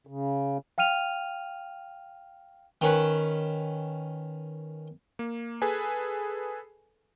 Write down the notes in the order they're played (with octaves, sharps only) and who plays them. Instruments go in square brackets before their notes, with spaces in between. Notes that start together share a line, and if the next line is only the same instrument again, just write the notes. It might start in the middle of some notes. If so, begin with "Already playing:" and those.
[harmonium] C#3
[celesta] F5 G5 F6 D#7 F7
[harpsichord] D#3 C#4 B4
[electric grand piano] A#3
G#4 A4 B4 G#5